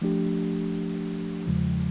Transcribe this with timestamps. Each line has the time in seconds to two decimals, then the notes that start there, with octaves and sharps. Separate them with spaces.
0.02 F3 A3 D4 G4
1.46 E2 C#3 F3 G#3